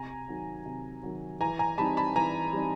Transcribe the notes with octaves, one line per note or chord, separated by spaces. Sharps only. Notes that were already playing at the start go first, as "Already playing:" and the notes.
Already playing: C3 G#5 A#5
D#3 F#3
C3
D#3 F#3
E3 G#5 A#5
G#5 A#5
G3 C4 D#4 A5 B5
A5 B5
E3 G#5 A#5
G3 C4 D#4